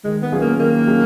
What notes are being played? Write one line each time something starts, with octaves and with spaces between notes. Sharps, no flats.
D#3 G#3
B3
F#3 C#4 F4 G#4
A#3
D#3 A#3
F#3 C#4 F4 G#4